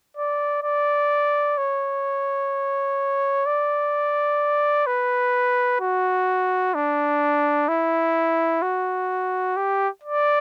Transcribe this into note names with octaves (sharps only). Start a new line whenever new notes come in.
D5
D5
C#5
D5
B4
F#4
D4
E4
F#4
G4
D5